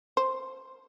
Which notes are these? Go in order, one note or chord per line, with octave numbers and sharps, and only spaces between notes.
C5